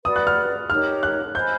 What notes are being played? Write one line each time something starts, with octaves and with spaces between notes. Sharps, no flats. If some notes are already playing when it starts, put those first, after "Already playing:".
F#4 B4 D5 D#6
F#6
F6
D#4 G4 A#4 C#5 F6
F#6
C5 D#5 G#5 B5 G6